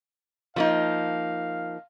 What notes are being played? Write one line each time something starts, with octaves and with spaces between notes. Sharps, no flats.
F3 A#3 D#4 F5